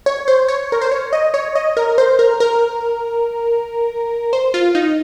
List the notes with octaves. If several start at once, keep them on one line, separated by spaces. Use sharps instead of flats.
C#5
C5
C#5
A#4
C5
C#5
D#5
C#5
D#5
A#4
C5
A#4
A#4
C5
F4
D#4